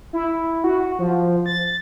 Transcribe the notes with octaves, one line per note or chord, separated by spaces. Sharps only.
E4
F#4
F3
A6